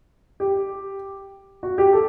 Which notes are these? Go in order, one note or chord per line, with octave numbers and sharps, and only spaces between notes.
G4
F#4
G4
A4